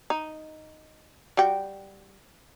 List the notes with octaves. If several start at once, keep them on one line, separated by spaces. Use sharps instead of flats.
D#4
G3 F#4 G5